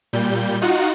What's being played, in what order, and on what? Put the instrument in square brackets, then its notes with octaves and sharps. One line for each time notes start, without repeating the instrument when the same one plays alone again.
[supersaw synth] A#2 G3 G6
D#4 F4 F#4 F#5